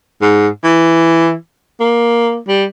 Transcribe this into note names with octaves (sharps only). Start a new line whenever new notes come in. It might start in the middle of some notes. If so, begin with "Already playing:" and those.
G#2
E3
A#3
G3